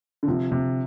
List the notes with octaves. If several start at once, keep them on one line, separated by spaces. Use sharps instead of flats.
D3
C3 F3
C3